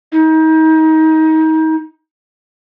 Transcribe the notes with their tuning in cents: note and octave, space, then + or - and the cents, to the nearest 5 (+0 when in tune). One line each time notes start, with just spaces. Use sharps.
D#4 +30